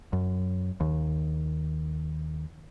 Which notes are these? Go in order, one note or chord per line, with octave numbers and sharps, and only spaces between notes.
F#2
D#2